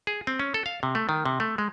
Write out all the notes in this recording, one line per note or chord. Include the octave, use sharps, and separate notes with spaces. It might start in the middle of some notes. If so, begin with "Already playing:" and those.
G#4
C4
C#4
A4
F5
C3
A3
D#3
C3
A3
G#3